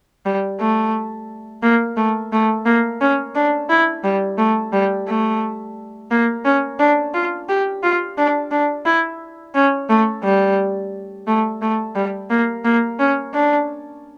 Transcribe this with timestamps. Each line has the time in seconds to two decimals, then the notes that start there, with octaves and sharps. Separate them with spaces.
0.25 G3
0.60 A3
1.63 A#3
1.97 A3
2.32 A3
2.66 A#3
3.01 C#4
3.35 D4
3.69 E4
4.04 G3
4.38 A3
4.73 G3
5.08 A3
6.11 A#3
6.45 C#4
6.79 D4
7.14 F4
7.49 G4
7.83 F4
8.18 D4
8.51 D4
8.86 E4
9.55 C#4
9.89 A3
10.23 G3
11.27 A3
11.62 A3
11.96 G3
12.30 A#3
12.65 A#3
12.99 C#4
13.34 D4